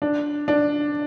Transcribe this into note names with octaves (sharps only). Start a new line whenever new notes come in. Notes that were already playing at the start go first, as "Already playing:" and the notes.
D4
D4